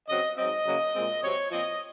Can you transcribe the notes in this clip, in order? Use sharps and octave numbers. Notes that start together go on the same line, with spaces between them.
C#3 F#3 C4 D#5
G#2 F#3 C4 D#5
C#3 F#3 A#3
A#2 G#3 C4
C3 F#3 C4 C#5
A#2 F3 C4 D#5